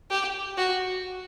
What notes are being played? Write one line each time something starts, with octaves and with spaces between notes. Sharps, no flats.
G4
F#4